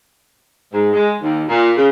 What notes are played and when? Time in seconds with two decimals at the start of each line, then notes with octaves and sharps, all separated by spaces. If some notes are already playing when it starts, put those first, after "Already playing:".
0.71 G#2
0.91 G#3
1.20 D#2
1.48 A#2
1.76 C#3